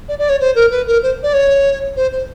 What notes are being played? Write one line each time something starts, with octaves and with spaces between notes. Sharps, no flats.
D5
D5
C#5
C5
A#4
B4
A#4
C5
D5
C#5
C5
C5